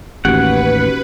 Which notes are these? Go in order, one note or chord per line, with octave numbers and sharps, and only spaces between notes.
A1 D#2 C#4 F#4 G4 B4 F#5